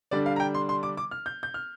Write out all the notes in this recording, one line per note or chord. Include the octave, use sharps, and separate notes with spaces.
D3 G3 D4 D5
F5
A#5
G5
C6
C6
D6
D6
F6
G6
G6
F6